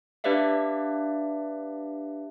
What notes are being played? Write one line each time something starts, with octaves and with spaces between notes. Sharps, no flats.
D4 G4 B4 D5 E5 F5